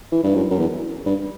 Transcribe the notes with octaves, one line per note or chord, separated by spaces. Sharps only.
E3
G2
F#2
F#2
E2
G2